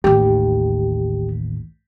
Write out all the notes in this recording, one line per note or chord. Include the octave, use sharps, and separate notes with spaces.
A1 D#2 G4